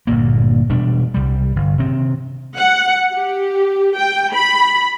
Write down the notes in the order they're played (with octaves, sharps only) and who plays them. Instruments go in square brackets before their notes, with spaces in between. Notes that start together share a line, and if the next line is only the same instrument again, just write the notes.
[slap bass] G1 D2 A#2 A#3
E1 B2 G3 D4
C2 G3
G1
C3 D#3 C4
[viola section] F#5
G4
G5
B5